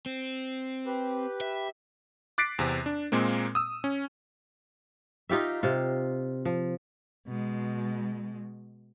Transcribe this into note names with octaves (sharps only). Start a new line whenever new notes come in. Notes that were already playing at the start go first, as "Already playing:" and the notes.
C4
G4 B4
E5
D6 F#6 A6 B6 C7 D7
E2 C3 C4
D4
A#2 G#3 A#3 C4
D#6 E6
C#4
D#4 F4 G4 E5
C3 F4
F3
B2 G#3